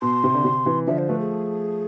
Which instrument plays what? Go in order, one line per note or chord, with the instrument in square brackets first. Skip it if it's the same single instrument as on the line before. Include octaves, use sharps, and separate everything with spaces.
[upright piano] B2 [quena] C6
[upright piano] C3
D3
C3
C3 E3
[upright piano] D3 F3 [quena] E5
[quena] C5
[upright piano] F3 A3 [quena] B4
[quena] G#4